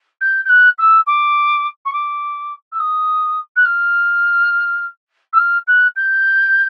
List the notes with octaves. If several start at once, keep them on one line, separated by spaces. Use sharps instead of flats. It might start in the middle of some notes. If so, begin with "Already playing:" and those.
G6
G6
F#6
E6
D6
C#6
D6
E6
D#6
F#6
F6
E6
F6
F#6
G6